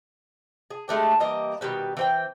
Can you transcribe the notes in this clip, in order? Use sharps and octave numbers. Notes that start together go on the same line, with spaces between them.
G#4
G#3 A3 D4 G4
E3 G3 A#3 D#5
B2 D#3 G3 B4
E3 C4 G5